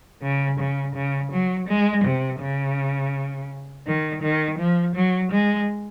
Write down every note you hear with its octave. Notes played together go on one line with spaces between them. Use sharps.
C#3
C#3
C#3
F#3
G#3
C3
C#3
D#3
D#3
F3
F#3
G#3